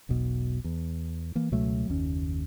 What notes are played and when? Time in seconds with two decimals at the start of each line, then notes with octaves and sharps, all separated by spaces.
0.09 E1 B1 B2
0.64 E2
1.35 E3 A#3
1.51 C#2 B2 F#3 A3
1.88 F#1 D#2 C#4